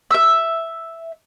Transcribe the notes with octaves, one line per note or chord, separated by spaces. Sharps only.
E5 E6